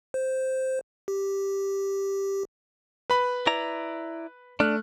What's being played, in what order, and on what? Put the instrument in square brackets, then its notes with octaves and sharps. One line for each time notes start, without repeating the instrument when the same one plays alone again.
[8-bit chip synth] C5
G4
[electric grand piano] B4 B5
[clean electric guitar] E4 D5 A#5
[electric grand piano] A3 F6 F#6 [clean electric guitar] D4